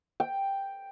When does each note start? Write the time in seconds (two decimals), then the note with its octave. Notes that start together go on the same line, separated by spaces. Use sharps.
0.20 G5